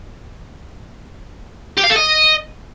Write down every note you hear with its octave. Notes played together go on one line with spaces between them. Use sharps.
G4
F5
A4
D#5